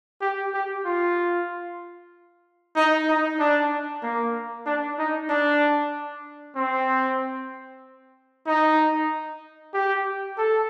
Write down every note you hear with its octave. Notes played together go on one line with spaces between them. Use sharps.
G4
G4
F4
D#4
D#4
D4
A#3
D4
D#4
D4
C4
D#4
G4
A4